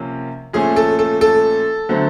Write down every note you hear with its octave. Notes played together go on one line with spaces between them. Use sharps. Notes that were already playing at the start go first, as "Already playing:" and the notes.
Already playing: C3 F3 A#3 C#4
A#2 F3 A3 C#4 G#4
A4
A4
A4
D3 F#3 A3 C4